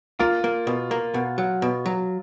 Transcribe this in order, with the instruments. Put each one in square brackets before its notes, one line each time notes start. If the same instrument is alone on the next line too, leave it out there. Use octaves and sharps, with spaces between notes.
[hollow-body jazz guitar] A#3 [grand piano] F4
[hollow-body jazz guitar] A#3
B2
A#3
B2
F#3
B2
F#3